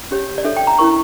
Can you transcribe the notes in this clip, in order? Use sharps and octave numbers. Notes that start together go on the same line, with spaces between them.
C#4 G4 C#5
D5
D4 A4 C#5 E5
G5
A#5
C#4 E4 A#4 C#6